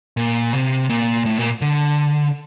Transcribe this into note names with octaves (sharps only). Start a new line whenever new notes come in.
A#2
C3
A#2
A2
A#2
D3